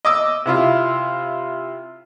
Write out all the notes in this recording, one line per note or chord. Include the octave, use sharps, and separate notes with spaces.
D#5 D6 E6
C3 E4 F4